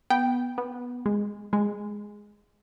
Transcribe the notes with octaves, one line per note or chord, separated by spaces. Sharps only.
B3 G5
B3
G#3
G#3